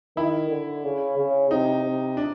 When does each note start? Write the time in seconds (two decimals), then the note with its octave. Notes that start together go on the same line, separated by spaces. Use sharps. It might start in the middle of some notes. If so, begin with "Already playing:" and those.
0.17 D#3 E4
0.50 D3
0.84 C#3
1.17 C#3
1.51 C3 D#4
1.84 C3
2.17 D4